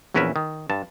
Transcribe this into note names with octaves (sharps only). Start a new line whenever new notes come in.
A#1 E2 C#4 A#4 B4 E5
D#3
G2 A5